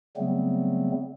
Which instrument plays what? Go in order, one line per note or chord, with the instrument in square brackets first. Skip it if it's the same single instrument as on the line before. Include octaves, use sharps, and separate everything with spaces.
[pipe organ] C#3 F#3 G3 A3 B3 C4